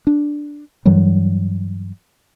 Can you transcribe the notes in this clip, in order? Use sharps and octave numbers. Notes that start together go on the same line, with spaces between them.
D4
G2 E3 F#3 G3